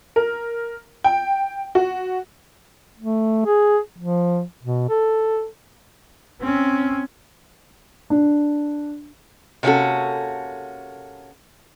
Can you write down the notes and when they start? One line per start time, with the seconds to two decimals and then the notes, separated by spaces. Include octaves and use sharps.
0.16 A#4
1.04 G5
1.75 F#4
2.99 A3
3.45 G#4
3.98 F3
4.63 B2
4.89 A4
6.41 C4 C#4
8.10 D4
9.63 C3 A#3 C#4 F4 F#4 A4